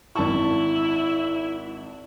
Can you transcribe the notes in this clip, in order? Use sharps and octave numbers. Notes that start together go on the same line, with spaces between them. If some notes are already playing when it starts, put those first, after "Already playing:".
G#1 E4 A5 C#6